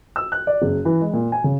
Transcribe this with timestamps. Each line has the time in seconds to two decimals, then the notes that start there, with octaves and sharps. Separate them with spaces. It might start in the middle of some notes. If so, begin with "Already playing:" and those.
0.16 E6
0.32 F#6
0.47 D5
0.62 F#1
0.85 E3
1.01 G#3
1.13 A#2
1.32 G#5
1.44 C#3